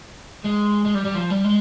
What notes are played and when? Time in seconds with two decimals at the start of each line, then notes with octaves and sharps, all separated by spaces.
0.44 G#3
0.85 G#3
0.94 G3
1.05 G3
1.14 F3
1.30 G3
1.44 G#3